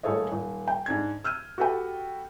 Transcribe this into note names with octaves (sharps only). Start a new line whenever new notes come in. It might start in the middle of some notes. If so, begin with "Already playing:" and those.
D#1 A3 G#4 A4 C#5 D#5
D#1
G5
G#2 D4 G#6
E6 F6 G6 D#7
F#4 G4 A4 B4 G5